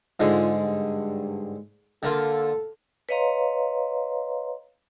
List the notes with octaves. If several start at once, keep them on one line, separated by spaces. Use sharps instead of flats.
G#2 D3 G#3 F4
G2
D3 A#3 F4 A4
B4 C#5 D#5 F5 A#5 C6